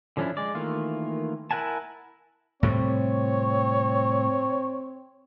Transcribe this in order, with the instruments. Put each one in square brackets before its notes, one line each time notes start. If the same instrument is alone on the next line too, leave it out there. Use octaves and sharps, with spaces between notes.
[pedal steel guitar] D3 F3 C#4 D4 E4
G#3 D5
D#3 E3 A3 A#3 F4
E4 A#4 F#5 G#5 A5
[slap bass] A2 C3 G3 [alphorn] C4 [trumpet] C#5